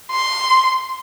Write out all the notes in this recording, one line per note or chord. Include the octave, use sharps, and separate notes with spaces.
C6